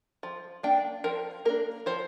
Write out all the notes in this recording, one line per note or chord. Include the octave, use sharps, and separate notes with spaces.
F3
A#3 D4 G5
F3 A#4
A#3 D4 A#4
F3 C5